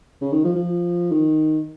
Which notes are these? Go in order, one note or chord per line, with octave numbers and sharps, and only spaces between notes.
C#3
D#3
F3
F3
D#3